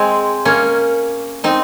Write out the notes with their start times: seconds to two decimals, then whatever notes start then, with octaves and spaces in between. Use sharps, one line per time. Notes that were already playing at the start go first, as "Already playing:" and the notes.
Already playing: G#3 C4
0.45 A#3 C#4
1.44 C4 D#4